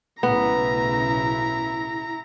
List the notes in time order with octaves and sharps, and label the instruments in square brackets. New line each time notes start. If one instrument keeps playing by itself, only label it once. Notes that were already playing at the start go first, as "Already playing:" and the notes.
[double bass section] B1 A2 C#3 [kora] B3 [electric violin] E4 A#5